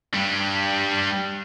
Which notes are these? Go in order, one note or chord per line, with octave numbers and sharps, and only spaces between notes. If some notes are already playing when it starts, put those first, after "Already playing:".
G2 G3